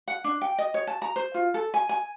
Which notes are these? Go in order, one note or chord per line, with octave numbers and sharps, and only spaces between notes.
F#5
D4
G5
D#5
C#5
A5
A#5
C5
F4
A4
G#5
G#5